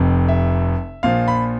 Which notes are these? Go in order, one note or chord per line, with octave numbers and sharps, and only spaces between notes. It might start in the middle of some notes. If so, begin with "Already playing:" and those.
Already playing: F1 F2 C3
E5
A#1 A#2 F3 F5
B5